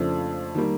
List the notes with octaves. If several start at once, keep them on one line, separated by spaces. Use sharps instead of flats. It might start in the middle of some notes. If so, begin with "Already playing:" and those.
Already playing: F2 C#3 F3 A3 D4
D#3 G3 A#3